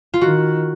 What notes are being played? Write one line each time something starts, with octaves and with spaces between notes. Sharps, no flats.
F4
D#3 F#4